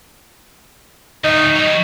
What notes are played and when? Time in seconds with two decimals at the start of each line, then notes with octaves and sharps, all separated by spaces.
1.24 D2 A2 D#4
1.56 F#3 G3